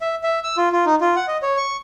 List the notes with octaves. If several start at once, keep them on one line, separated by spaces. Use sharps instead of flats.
E5
E5
E6
F4
F4
D#4
F4
F#5
D#5
C#5
C#6